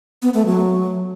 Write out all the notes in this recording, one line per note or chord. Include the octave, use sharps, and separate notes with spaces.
B3
A3
F#3